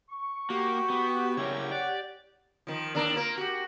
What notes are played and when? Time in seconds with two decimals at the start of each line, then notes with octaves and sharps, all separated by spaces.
0.10 C#6
0.50 A#3 F#4 G4
0.90 B3
1.37 C#3 E4 A#4 C#5
1.72 D5 F#5
2.67 D#3 F3
2.95 D#2 D4 A#4
3.16 A#3 F4 A#4
3.38 F#4 G4